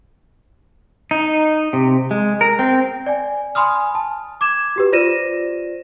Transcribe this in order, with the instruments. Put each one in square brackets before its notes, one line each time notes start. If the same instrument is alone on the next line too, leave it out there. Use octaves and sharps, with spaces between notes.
[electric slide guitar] D#4
C3
G#3
A#4
C4
[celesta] D5 G#5
G#5 B5 C6 D#6 F6
A5
D6 G#6 E7
F#4 G4 B4
F4 C5 D5 A#6 D#7 E7